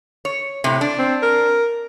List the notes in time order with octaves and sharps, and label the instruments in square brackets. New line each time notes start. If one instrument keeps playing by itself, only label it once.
[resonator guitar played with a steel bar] C#5
A2 C3
D4
[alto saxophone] C4
A#4